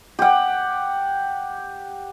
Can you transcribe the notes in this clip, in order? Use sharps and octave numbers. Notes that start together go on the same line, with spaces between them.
G4 F#5